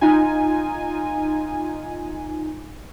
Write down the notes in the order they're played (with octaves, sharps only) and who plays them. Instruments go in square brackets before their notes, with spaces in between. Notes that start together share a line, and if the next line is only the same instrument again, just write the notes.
[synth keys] D#4 F4 G#5